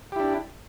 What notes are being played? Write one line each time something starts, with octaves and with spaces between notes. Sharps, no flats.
D4 E4 G4